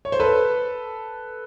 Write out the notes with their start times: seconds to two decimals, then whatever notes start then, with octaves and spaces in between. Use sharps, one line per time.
0.05 C#5
0.12 C5
0.20 A4 B4